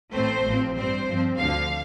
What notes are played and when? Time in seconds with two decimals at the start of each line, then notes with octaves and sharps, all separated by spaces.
0.13 A1 A2 A3 C4 C5
0.45 A1 A2 F3 C4
0.76 G2 G3 C4 C5
1.07 G2 F3 C4
1.38 D2 D3 F3 F5